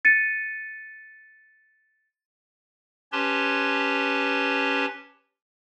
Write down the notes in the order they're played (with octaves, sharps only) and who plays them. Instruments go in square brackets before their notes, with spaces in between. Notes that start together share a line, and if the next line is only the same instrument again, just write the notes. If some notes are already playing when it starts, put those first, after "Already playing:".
[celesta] A6 C#7 D#7
[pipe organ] C#4 G4 B4 C#5 A5 C6